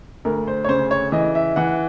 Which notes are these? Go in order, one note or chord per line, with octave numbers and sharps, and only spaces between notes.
D2 A#4
C5
C#5
C#3 C5
C#5
E3 D#5
E5
E3 F#5